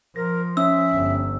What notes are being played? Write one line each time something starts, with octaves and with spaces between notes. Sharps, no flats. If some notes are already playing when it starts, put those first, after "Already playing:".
F3 A#4 A#6
C#4 E5 D#6 E6
G1